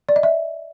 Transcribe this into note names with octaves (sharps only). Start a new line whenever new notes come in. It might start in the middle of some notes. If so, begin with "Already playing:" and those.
D5
D#5
E5